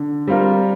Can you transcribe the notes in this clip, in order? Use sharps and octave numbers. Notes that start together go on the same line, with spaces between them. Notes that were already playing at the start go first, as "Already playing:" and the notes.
Already playing: D3
G3 C4 F4 A#4